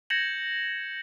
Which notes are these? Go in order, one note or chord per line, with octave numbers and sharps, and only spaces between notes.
G6 G#6 A#6 C#7 E7 F#7